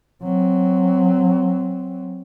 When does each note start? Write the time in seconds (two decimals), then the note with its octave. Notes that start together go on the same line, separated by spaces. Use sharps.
0.23 F#3 C4